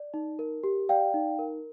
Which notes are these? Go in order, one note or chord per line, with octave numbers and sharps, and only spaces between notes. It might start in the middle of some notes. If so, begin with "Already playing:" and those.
Already playing: D5
D#4
A#4
G4
D5 F5 G5
D#4
A#4